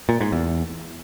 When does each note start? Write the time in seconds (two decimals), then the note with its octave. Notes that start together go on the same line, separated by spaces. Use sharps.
0.09 A#2
0.21 G#2
0.32 E2